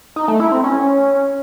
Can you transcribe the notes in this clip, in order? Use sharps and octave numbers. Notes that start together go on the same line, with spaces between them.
D#4
A3
E4
C4
C#4